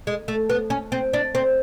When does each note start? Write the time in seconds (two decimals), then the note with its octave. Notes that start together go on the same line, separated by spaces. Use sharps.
0.07 G#3
0.28 A3
0.50 B3
0.70 C#4
0.92 C4
1.13 D4
1.35 C4